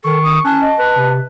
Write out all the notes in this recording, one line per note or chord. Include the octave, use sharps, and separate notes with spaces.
D#3 A4 C#6
D#6
C#4 A5 F#6
D#5
B4
C3